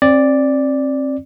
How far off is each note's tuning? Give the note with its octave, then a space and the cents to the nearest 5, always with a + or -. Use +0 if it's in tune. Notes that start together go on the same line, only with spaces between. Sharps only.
C4 +35 D5 +0